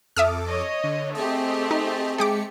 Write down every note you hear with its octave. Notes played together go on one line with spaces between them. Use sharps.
F2 A4 E5 D6 D#6 F6
C#5 D#5
D3
A3 C4 G4 G#4 D#5
D#4
G#3 G#4 G5 D6 B6 C#7